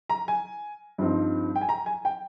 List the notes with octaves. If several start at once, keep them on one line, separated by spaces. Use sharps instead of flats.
A#5
G#5
G2 F3 C4 D#4
G5
G#5
A#5
G#5
G5